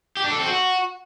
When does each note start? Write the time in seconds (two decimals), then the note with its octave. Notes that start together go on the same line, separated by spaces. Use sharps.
0.17 G4
0.24 D4
0.32 A4
0.39 C4
0.46 F#4